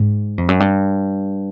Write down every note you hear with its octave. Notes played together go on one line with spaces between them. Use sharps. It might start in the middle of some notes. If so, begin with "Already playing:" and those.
Already playing: G#2
F2
F#2
G2